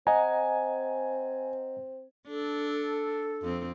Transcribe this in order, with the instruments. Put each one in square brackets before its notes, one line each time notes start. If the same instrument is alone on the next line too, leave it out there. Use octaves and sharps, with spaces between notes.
[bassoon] C4 [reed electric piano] D#5 F#5 A#5 [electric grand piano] G#5
[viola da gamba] D4 [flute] A4
[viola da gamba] F2 C4